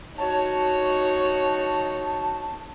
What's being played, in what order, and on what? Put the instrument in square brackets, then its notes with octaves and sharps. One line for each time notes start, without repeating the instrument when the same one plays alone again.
[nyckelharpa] D#4 F#4 [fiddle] C#5 [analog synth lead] A5